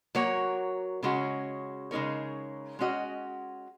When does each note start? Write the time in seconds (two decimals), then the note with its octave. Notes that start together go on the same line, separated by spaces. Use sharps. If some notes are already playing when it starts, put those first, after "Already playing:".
0.15 F#3 A#3 F#4 C#5
1.03 C#3 G#3 C#4 F#4
1.91 C#3 G#3 D#4 A#4 C#5
2.79 G#3 C#4 F#4 D#5